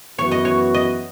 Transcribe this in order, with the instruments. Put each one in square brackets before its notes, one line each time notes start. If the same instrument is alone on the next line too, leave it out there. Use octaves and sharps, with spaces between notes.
[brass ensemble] F#2 E3 B3 F#4 [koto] C#5
[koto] D#5
C#5
D#5